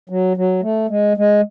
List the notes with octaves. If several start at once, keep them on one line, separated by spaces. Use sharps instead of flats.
F#3
F#3
A3
G#3
G#3